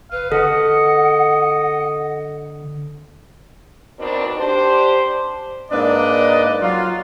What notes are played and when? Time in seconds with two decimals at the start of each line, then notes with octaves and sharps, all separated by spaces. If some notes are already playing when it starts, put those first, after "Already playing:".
0.12 F#1 B4 F5
0.32 D3 A4 D#5 F#5
3.99 B2 D#3 C4 D4 D5
4.37 D4 G4 C5
5.71 G#2 A#3 D4 B4 D5 D#5
6.61 F#3 F4